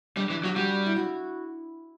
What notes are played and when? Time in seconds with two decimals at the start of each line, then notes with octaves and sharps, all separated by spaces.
0.16 G3 D4
0.30 E3
0.44 F#3 G4
0.56 G3 F#4
0.86 E4
0.96 F#4